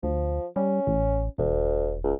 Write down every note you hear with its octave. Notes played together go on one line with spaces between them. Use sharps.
D2 F3
G3 C#4
A1
E1 D2
C#2